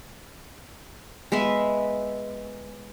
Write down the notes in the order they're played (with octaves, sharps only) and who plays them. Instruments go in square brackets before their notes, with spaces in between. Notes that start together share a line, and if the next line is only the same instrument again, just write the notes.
[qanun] G#3 B3 B4 E5